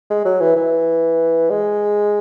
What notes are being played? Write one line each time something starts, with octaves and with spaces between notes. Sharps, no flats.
G#3
F#3
E3
E3
G#3